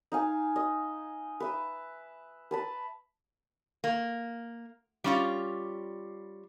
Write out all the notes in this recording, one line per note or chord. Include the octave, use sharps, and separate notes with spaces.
D#4 F5 G#5
D#5
B4 E5
B4 A5 B5
A#3
G3 C#4 F4